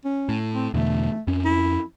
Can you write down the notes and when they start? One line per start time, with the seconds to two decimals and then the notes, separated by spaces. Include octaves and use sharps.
0.05 C#4
0.29 A2
0.54 C4
0.74 E2 B2 D3 A3
1.27 F2 C#4
1.45 E4